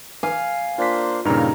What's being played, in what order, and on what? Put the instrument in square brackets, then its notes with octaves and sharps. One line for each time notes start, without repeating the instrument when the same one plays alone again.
[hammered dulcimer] F5 [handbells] G#5
[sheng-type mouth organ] A#3 D4 C5 [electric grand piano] F4 B6
[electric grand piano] G2 A#2 C#3 [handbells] D#4 G4 A#5 [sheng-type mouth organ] A#4 F6